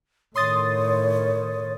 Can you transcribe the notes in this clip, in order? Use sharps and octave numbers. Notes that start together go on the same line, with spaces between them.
A2 D#3 C#5 C6 D#6 A6